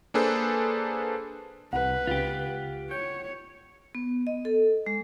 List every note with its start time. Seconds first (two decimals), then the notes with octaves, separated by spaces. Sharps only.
0.14 A#3 D4 G#4 A4 B4 C5
1.73 C2 B4 F#5
2.07 C#2 F4 G4
2.91 C#5 G5
3.95 B3
4.27 D#5
4.45 A4
4.86 G#3